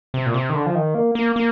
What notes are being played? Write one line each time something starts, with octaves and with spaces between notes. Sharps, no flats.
C3
A#2
C3
D#3
D3
F3
D#3
A#3
A#3
A#3